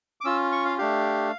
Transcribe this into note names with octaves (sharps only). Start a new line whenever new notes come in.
D6
C#4 F4 E6
C#6
F5
A3 D4 G4 F5